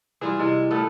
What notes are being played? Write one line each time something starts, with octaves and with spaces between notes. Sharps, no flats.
E3 G3 F4 G#4
C3 G#3 E4
A#2 A3 B3 A4